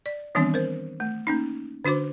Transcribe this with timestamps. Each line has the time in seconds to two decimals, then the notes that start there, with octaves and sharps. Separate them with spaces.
0.06 D5
0.35 D#3 E3 G3 B3 C4 D4
0.54 A#4 C5
1.00 A3
1.27 A#3 C#4 D#4
1.85 D3 D4 F#4 C5 D6